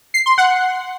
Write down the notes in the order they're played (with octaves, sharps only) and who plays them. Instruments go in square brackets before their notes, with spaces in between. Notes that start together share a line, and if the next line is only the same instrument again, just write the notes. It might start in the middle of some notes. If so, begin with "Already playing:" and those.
[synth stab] C7
C6
F#5